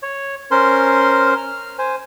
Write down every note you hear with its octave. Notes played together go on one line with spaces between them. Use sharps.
C#5
C#4 A#4 C5 C6
F6
C5 G#5